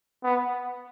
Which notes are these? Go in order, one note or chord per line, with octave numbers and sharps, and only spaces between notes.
B3